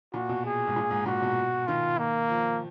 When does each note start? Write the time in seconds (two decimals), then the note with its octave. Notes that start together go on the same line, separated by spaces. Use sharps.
0.14 A#2 F#4
0.29 B2
0.45 G#4
0.67 G#2
0.76 A#2
0.91 G#2
1.06 A#2 F#4
1.22 B2
1.67 D#3 F4
1.99 A#3
2.29 F3